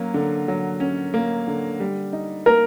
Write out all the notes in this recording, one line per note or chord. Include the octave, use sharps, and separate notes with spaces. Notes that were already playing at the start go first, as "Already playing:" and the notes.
Already playing: F#3 A#3 C#4
D3
F#3
C#4
A#3
D3
G3
D#4
A#3 A#4